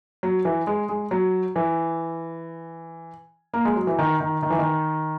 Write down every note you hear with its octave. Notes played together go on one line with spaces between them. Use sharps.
F#3
E3
G#3
G#3
F#3
E3
A#3
G#3
F#3
E3
D#3
D#3
D#3
E3
D#3